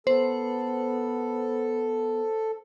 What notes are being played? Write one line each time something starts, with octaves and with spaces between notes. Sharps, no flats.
B3 A4 C5